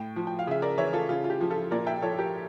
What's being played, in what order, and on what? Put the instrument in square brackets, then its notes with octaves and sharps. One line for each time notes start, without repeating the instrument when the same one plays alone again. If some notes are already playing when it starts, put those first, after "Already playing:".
Already playing: [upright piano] A2 G5
F3
G5
F5
C#3 E5
A#4 D5
E3 C#5 E5
F4 A4
C#3 F4
F4
G4
F3
F4 A4
A#2 A#4 D5
E5 G5
F3 A4 C#5
G4 A#4